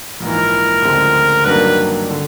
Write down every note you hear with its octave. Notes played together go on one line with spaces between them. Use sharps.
A#1 G#2 E3 A#4
D2 C#3 F3 G#3 C4
G2 D#3 F#3 A#3 D4 B4
D3